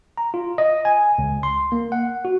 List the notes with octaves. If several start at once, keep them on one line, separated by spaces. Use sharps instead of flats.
A#5
F4
D#5
G#5
C#2
C6
A#3
F#5
F#4